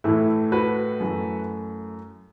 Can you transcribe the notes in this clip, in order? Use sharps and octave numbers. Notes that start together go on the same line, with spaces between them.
A2 E3 A3 E4
F#4 B4
F#2 E3 A3